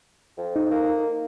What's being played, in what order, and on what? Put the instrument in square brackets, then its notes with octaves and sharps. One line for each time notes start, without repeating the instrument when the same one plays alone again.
[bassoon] F2
[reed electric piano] D#4
[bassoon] A#3